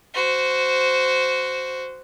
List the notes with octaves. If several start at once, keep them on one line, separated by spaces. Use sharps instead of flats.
F#4 C5